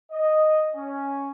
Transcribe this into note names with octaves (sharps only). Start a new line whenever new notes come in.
D#5
C#4